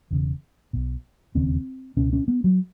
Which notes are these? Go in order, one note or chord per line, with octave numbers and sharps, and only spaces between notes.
E1 E2 C#3
B1 B2
E1 D#2 C#3 C4
C#2 B2 C#4
C#4
B3
F#3